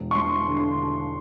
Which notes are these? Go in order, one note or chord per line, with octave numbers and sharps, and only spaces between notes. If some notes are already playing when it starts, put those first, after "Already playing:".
Already playing: E1
C#6
G3 C6
D3
C6